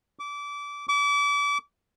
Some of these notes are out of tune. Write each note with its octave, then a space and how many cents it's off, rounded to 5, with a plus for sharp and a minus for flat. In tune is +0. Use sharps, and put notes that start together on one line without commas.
D6 -25
D6 -35